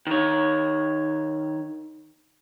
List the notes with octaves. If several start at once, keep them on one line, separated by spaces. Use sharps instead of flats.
D#3 C#5